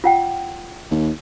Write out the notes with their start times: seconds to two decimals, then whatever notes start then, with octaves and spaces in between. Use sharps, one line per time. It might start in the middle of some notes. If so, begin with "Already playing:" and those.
0.04 F4 F#5 G5
0.91 D#2